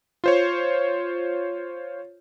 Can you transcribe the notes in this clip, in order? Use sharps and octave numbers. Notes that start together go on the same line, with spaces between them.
F4 C5 C#5